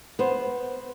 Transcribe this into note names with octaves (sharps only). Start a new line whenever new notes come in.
B3 C5